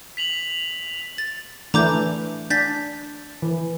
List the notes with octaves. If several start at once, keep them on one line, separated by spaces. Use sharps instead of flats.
B6 F7 F#7
A6
E3 A3 D4 A#5 D6 G6
D4 G6 A6 B6
E3